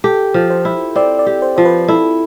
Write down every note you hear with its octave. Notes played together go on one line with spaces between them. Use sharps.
G4 A4
F3
C5
E4
C4 D5
D5
G4
C5
F3 C5
B4
E4 A4